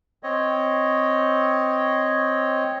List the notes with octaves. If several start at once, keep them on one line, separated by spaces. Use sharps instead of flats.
C4 C#5 D#5